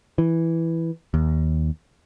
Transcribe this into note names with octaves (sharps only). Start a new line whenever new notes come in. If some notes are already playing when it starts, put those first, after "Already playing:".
E3
D#2